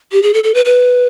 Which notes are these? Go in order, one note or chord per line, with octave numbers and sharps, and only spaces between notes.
G4
G#4
A4
A4
B4
B4